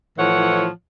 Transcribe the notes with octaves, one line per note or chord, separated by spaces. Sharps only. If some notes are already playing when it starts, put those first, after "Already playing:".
A2 E3 F3 C#5 F#5